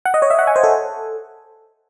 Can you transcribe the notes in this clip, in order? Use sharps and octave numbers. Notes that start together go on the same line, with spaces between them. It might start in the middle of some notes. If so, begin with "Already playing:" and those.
F#5
D#5
C#5
E5
F#5
G#5
C5
A4